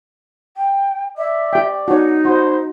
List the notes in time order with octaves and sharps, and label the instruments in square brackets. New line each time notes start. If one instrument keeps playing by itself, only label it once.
[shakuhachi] G5
[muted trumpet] D5 [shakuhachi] E5
[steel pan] G4 G5
[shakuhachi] D#4 [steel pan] F#4 C#5
[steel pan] F#4 [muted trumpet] C5